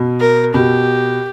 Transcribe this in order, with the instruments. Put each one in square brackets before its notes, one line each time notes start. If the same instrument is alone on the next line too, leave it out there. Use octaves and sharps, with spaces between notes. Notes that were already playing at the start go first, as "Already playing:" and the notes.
Already playing: [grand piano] B2
[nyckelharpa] A#4
[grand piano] B2 [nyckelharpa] G4